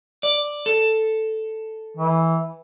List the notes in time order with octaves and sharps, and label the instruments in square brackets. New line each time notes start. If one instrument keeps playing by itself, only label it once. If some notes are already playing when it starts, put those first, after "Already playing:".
[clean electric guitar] D5
A4
[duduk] E3